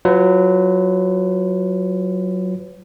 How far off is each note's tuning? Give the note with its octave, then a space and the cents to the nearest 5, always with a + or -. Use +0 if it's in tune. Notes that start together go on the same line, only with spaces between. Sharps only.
F#3 +0 F4 +0 B4 +35